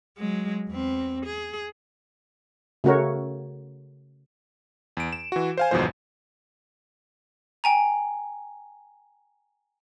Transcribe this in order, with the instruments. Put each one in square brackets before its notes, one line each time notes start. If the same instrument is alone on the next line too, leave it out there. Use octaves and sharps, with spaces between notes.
[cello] F#3 G#3
E2 C4
G#4
[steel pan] C#3 A3 F#4 A#4 C#5
[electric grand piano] E2 D7
E7
E3 F#4
C5 F5 G#5
G1 E2 G#2 B2 F3 C5
[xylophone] G5 G#5 A#5